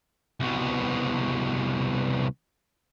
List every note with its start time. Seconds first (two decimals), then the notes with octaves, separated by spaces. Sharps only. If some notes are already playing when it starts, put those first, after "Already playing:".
0.40 C2 B2